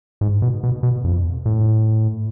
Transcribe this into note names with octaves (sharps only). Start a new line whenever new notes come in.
G#2
B2
B2
B2
F2
A2